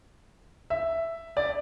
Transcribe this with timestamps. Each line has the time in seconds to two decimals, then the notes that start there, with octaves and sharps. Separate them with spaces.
0.70 E5
1.37 D5